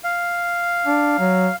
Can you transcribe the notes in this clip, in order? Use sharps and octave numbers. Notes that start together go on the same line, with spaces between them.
F5
D4
F#3